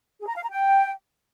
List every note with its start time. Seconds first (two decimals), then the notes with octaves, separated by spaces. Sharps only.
0.22 G#4
0.29 A#5
0.36 F5
0.43 A#5
0.50 G5